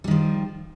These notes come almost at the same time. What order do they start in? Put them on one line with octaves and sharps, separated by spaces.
G3 D#3 F3